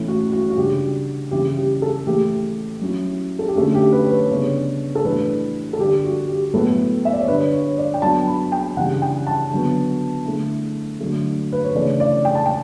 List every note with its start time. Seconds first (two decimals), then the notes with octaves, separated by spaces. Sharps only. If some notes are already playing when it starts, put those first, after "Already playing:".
Already playing: A2 E3 A3 C#4 E4
0.08 F#4
0.32 F#4
0.50 F#4
0.57 C#3 G3 D4 G4
1.31 C#3 E3 G3 C#4 E4 G4
1.57 G4
1.82 A4
2.06 A2 E3 A3 G4
2.81 F#3 C#4 E4
3.39 A4
3.48 G4
3.55 D3 A3 C#4 F#4
3.75 G4
3.92 B4
4.04 C#5
4.11 B4
4.30 C#3 G3 B3 D4 C#5
4.95 A4
5.04 A2 E3 G3 D4 B4
5.73 A4
5.78 D3 G3 D4 G4
6.04 F#4
6.28 G4
6.53 A2 F#3 B3 E4 A4
7.05 E5
7.13 D5
7.21 C#5
7.28 D3 G3 D4 B4
7.52 C#5
7.78 D5
7.94 G5
8.02 F#3 B3 D4 A5
8.28 B5
8.52 G5
8.77 C#3 E3 G3 D4 F#5
9.02 G5
9.27 A5
9.51 D3 F#3 B3
10.25 D3 A3 E4
11.00 D3 F#3 A3
11.52 B4
11.64 C#5
11.75 C#3 E3 A3 D4 D5
12.00 D5
12.25 G5
12.35 A5
12.46 G5